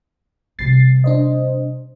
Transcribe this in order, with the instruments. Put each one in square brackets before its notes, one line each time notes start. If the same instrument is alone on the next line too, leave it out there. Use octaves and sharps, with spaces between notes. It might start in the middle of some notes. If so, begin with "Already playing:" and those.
[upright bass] C3 G3 [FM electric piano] A6 C7
[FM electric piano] D4 C5 D#5